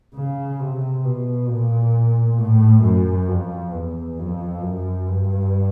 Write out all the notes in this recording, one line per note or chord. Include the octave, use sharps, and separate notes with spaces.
C#3
C3
B2
A#2
A2
F#2
F2
E2
F2
F#2
G2